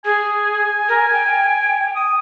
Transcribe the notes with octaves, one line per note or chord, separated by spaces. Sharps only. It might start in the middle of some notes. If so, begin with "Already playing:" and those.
G#4 G#5
A#4
G5
D#6